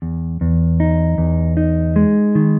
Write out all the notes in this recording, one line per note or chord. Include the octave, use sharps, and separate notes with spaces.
E2
E2
D#4
E2
D#4
G#3
D#3